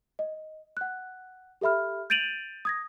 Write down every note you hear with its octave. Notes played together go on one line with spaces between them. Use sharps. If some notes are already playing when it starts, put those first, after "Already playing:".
D#5
F#5 F#6
G4 A4 E5 B5 F6
G6 A6 D7 D#7 F7 F#7
D#6 G#6 A#6